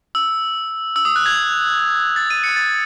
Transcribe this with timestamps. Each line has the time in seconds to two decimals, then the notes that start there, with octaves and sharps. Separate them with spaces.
0.15 E6
0.96 E6
1.05 D#6
1.16 F#6
1.26 G#6
2.16 A6
2.30 D#7
2.44 C#7
2.56 A6